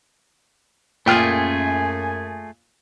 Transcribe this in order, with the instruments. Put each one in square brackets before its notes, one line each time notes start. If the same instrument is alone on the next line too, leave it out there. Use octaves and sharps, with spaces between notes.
[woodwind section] F#2 G#5 [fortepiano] A#2 G5 F6 [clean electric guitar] A3 F4 G#4